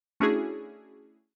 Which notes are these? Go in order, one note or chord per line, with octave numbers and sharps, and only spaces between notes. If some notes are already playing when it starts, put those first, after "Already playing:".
A3 C#4 D4 E4 F#4 G#4